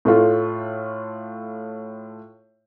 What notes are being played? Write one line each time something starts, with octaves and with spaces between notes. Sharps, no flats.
A2 A3 F4